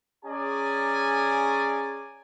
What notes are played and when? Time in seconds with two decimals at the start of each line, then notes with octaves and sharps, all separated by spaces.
0.24 C#4 G#4 C#5 D5 G#5 A#5